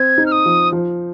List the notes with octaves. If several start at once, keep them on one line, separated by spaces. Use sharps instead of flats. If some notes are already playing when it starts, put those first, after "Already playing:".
Already playing: C4 G#6
D#4
F6
D#6
F3
F3